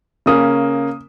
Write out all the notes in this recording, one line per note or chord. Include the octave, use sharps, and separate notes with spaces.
C#3 A#3 C#4 D#6